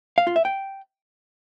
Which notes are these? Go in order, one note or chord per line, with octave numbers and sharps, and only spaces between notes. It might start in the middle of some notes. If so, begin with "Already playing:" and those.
F5
F4
E5
G5